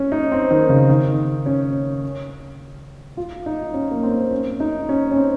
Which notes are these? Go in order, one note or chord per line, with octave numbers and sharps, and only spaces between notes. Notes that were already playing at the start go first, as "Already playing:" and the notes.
Already playing: C#4
D#4
C4
D#3
C#3
D#3
C#4
F4
D#4
C#4
A#3
C4
C#4
D#4
C#4
C#4
C4